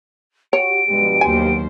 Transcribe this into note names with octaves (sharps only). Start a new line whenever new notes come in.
F#4 G4 C#5 D7
G2 B2 F3 G#3 G4
D#2 F#3 C5 G#5